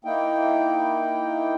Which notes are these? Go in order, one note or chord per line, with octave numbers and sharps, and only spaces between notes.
A#3 D#4 E4 G5